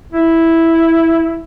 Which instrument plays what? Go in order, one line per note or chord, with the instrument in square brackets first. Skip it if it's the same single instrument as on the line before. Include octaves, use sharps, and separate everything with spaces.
[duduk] E4